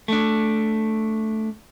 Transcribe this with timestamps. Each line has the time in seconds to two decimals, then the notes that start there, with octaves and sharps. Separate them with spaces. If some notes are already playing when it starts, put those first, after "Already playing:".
0.08 A3 D4